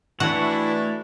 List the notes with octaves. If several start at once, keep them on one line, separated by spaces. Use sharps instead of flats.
E3 A3 D4 E4 F#4 C#5 F#5